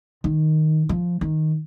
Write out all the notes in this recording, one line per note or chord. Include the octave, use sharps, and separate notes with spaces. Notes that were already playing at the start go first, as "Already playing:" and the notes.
D#3
F3
D#3